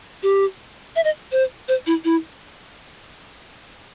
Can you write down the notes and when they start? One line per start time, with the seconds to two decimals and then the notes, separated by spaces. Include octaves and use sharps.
0.23 G4
0.96 E5
1.04 D#5
1.32 C5
1.68 C5
1.87 E4
2.05 E4